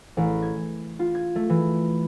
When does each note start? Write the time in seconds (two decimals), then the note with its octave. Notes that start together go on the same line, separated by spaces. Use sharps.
0.17 A1
0.43 G#6
0.99 F4
1.15 G#6
1.36 A3
1.50 E3